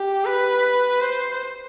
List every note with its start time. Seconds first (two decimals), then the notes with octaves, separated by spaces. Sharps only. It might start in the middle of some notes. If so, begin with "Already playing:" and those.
Already playing: G4
0.25 B4
1.01 C5